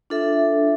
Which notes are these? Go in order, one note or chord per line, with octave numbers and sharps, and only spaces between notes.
D4 F4 A4 E5